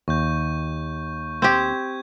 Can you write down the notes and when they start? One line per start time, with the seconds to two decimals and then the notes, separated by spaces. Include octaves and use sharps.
0.08 D#2 C#6 G6
1.42 C4 G4 G6 G#6